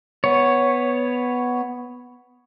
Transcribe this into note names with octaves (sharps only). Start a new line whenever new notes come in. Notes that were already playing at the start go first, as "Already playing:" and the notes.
B3 C#5